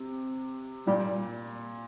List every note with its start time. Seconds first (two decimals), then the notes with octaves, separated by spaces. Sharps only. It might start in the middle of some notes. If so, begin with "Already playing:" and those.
Already playing: C3
0.87 A#2 G3